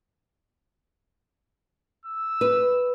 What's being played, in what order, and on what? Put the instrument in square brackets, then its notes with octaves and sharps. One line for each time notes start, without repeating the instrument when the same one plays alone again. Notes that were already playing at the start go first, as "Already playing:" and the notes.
[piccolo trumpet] E6
[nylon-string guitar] B4